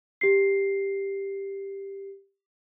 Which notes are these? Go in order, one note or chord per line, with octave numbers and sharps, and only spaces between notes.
G4 C7